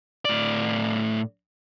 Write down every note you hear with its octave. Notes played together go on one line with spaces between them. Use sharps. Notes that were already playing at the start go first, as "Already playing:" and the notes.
A2 D5